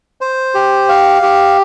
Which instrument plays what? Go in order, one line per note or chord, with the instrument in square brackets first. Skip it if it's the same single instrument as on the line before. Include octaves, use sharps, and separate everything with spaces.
[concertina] C5
G4
F5
G4